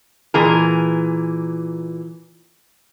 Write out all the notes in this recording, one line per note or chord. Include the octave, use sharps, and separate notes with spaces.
A#2 E3 G#4 A#4